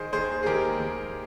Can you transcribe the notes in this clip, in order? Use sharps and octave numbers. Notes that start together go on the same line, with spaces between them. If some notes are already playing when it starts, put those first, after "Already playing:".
Already playing: D#3 G#4 C5
D#2 G#4 C5
G#4
D#2 G4 A#4
D#2